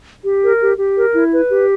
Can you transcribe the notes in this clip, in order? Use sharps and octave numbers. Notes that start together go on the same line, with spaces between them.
G4
A#4
G4
G4
A#4
E4
B4
G4